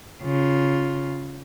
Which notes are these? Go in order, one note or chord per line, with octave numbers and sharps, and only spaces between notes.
C#3 F4